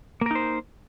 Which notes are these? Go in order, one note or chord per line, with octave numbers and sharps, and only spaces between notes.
A#3 D#4 A#4 C5